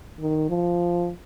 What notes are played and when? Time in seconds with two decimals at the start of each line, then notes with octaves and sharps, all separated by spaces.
0.20 D#3
0.49 F3